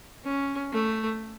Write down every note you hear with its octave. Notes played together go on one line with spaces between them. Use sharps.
C#4
A3